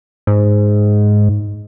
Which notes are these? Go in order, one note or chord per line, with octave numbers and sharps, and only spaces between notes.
G#2